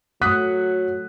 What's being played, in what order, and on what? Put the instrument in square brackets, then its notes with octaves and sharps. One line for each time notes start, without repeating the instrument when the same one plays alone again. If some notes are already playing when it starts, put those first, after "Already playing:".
[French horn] F#3 [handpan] A3 F#5 [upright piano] D#6 F#6 B6